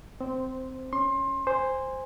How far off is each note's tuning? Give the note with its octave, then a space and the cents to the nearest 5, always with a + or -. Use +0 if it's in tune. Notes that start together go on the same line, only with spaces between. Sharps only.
C4 -15 C5 +0
C#4 +0 C6 +25
C5 +0 G#5 -20